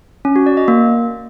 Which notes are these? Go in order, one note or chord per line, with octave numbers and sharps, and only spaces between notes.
C#4
F#4
D5
D#5
A#3